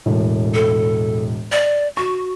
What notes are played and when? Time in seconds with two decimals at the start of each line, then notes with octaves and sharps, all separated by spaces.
0.06 E1 A2
0.54 A4
1.52 D5
1.97 F#4 C#6